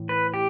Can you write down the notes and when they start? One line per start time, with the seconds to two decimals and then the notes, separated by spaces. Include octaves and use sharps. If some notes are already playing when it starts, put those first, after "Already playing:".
Already playing: A2 E3
0.09 B4
0.34 G4